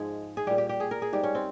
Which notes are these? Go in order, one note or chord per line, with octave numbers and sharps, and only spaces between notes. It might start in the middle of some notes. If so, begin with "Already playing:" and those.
Already playing: G#2 F3 G#3 G#4
G#4
A#2 G3 G4
G4
G4
G#4
A#4
G#4
G#2 G3 G4
C#4
C4